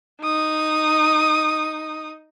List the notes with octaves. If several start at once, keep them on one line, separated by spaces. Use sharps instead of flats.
D#4 D#6